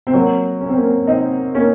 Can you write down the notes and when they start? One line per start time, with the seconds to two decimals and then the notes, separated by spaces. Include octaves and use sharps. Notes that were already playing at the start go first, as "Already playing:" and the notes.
0.07 C4
0.13 F#3 A#3
0.61 C#4
0.69 C4
0.77 A#3 C#4
1.07 C4 D#4
1.55 A#3 C#4